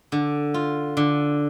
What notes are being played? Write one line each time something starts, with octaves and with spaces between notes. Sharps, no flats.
D3
F4
D3